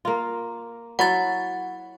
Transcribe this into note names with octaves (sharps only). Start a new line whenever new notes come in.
A#3 F4
F#3 E4 C#5 F#5 A6